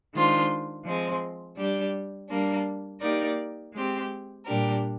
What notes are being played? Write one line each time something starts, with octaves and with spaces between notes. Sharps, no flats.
D#3 G#3 D4 F4 C5
F3 G#3 C4
G3 D4 G4
G3 A#3 D4
A#3 D#4 G4 A#4 D5
G#3 C4 G4
A#2 G3 D4 G4 A#4